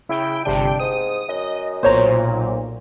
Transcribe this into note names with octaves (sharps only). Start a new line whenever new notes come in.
C#3 E4 G5
G1 C3 D4 G5
G#2 D#6 D#7
F#2 D#5
B1 A#2 C5 C#5 A#5